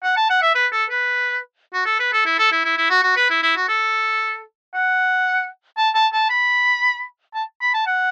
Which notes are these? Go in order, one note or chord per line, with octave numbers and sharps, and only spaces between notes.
F#5
A5
F#5
E5
B4
A4
B4
F#4
A4
B4
A4
E4
A4
E4
E4
E4
F#4
F#4
B4
E4
E4
F#4
A4
F#5
A5
A5
A5
B5
A5
B5
A5
F#5